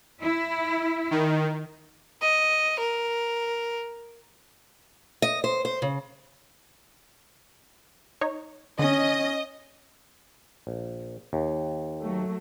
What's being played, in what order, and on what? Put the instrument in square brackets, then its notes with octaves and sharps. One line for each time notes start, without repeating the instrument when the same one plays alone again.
[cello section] E4
[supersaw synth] D#3
[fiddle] D#5
A#4
[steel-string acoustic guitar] D#5
C5
C5
C#3
[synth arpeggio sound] D#4 C#5
[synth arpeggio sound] D3 [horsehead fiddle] C#4 [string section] D#5
[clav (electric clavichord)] A#1
D#2
[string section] F#3 A3